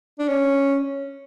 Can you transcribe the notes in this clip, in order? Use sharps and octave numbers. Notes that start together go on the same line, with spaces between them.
D4
C#4